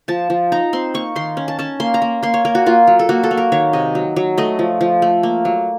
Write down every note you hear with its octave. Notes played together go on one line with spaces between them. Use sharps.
F3 A5
F3
D#4 A#5
C4 C6
A#3 C#6
D#3 C6
C#4
A5
C#4 A5
A#3 C6
A#5
A#3
A#3 C6
C#5
A#3 A#4
F#4
A#3 F4
F#3
A4
A#3 F#4
A4
A#3
A#4
D#3 C#5
C3 D#5
F#3
F#3
A3 D#5
F3
F3
A3
A#3
F#3